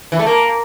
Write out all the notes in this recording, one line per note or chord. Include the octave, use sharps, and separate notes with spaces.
E3
A3
A#3